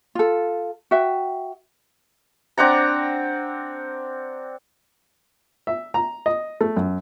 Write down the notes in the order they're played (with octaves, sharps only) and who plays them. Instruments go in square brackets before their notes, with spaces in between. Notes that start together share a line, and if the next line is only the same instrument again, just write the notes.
[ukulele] F4 A4
F#4 E5 G5
[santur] C4 D4 F#5 A#5
[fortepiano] E5
A#5
D#5
A3
F#2